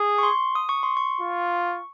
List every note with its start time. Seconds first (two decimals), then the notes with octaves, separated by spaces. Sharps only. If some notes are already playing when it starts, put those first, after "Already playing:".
Already playing: G#4
0.18 C#6
0.23 C6
0.55 D#6
0.69 C#6
0.83 C6
0.97 C#6
1.21 F4